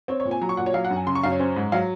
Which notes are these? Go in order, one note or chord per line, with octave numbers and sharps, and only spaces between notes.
C4 C#5
C#5
A#2
G#5
F#3 A#5
C#6
A#2 F#5
C#5
F#3 F5
F#5
F#2
G#5
C#3 C6
C#6
F#2 F5
C#5
C#4 C5
G#2
F#3 F5